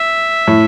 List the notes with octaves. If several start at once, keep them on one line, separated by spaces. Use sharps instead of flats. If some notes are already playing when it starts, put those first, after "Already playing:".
Already playing: E5
A2